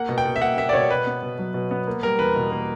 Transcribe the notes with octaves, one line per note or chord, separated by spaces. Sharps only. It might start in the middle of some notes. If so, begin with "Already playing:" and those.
Already playing: A#3 F#5
B2
G5
B2
E5
A#3 F#5
A#3 E5
D5
B2 C#5
B2 B4
B3
B2
F#3
B2
B3
A#3
G3 A#4
E2 B4
B2
A#3